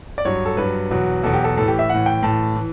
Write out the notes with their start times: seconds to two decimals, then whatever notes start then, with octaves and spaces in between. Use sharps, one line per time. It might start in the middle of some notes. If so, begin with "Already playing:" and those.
0.18 D5
0.25 G2 F#3 C#5
0.45 A4
0.57 G2 F#3 B4
0.91 E2 B2 F#3
1.23 E2 B2 F#3 A4
1.34 G4
1.44 A4
1.57 A2 E3 A4
1.68 G4
1.79 E5
1.89 A2 E3 F#5
2.06 G5
2.23 A2 E3 A5
2.56 E3